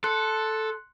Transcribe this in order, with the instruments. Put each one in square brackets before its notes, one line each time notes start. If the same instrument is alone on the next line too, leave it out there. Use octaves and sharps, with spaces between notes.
[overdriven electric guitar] A4 [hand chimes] C6 F#6 C#7